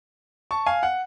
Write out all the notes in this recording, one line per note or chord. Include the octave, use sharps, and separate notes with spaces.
A5 C#6
F5 G#5
F#5